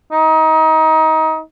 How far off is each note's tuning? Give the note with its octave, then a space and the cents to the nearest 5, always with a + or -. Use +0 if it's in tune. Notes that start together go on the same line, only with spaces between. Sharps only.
D#4 +25